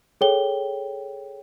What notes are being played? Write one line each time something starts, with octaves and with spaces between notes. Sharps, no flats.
G#4 A4 C#5 G5 G7